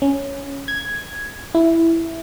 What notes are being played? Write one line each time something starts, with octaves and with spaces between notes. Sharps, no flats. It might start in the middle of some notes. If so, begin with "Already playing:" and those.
C#4
G#6
E4